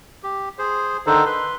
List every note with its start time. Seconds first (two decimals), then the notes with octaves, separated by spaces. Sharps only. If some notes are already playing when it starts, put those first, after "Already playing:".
0.23 G4
0.59 G#4 C5
1.07 D3 D#3 D4 D#4 A4 C5
1.26 B4 C6